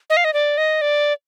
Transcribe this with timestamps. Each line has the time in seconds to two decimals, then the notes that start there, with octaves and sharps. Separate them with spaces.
0.10 D#5
0.17 F5
0.25 D#5
0.34 D5
0.58 D#5
0.81 D5